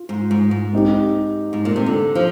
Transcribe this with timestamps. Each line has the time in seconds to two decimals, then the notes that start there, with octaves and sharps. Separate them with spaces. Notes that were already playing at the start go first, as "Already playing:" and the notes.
Already playing: F4
0.09 G#2
0.31 G#2
0.51 G#2
0.73 C4 D#4 G4
1.53 G#2
1.65 A#2
1.76 C3
1.86 D3
2.15 F3